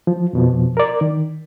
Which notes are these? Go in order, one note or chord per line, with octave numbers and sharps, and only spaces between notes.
F3
F2 B2 F3
A#4 D5
D#3